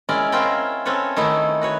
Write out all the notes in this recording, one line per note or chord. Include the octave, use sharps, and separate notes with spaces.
G#3 C#4 E4 A#4 D5
C4 C#4 E4 F4 A#4 G5
C4 C#4 A4 B4 C#5
D#3 A3 D#4 E4
F#4 B4 C#5